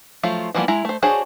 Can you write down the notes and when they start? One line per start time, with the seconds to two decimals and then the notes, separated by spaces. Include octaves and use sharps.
0.23 F3 F#3 A3 F4
0.54 E3 F3 G3 A#3 B3
0.68 G#3 E4 A#5
0.85 A3 C5
1.02 D4 F#4 G#4 C5 C#5